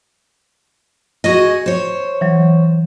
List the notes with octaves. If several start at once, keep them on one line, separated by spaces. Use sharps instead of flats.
F#4 G#4 D#5
C5 C#5
E3 F#3